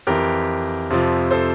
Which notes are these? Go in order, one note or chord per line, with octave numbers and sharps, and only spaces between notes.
F2 E3 G4 A#4
F2 C3 F3
A4 C5